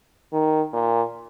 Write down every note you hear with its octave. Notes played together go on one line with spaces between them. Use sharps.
D#3
A#2